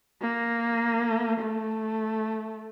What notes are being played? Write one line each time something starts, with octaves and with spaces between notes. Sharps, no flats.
A#3
A3